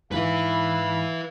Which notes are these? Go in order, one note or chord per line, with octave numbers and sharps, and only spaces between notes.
G#2 E3 B4 E5 F5 B5